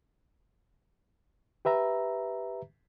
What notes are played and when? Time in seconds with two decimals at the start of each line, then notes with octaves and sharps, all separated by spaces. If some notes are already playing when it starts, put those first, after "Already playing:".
1.65 G4 B4 E5 A#5